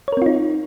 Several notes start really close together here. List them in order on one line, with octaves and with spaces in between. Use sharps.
C#5 A#4 C4 F4 D#4